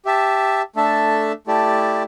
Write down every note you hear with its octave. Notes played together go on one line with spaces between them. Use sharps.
G4 E5 A5
A3 D4 A4 E5 A5
A3 E4 G4 D5 A5